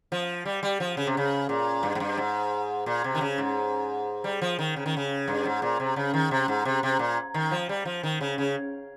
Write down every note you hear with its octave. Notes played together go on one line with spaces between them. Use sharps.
F3
G3
G3
F3
C#3
C3
C#3
A#2
G2
G#2
G2
G#2
A#2
C3
D#3
C#3
G#2
G3
F3
D#3
C#3
D#3
C#3
G2
G#2
A#2
C3
C#3
D#3
C3
G#2
C3
C3
A#2
D#3
F3
G3
F3
D#3
C#3
C#3